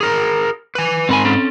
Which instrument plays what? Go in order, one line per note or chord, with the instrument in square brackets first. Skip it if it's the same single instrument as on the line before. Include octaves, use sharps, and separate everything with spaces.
[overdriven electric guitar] G#4 A#4
B4 G#5
[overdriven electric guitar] G#2 B5 [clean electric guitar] C4 A#4 G#5
[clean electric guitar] C4 C#4 A4